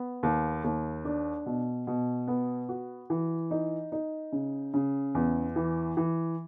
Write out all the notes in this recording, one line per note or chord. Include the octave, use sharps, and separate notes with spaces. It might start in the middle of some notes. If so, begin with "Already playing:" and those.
Already playing: B3
D#2
D#2
D4
B2
B2
B3
F#4
E3
D#4
D#4
C#3
C#3
E2
E3
E3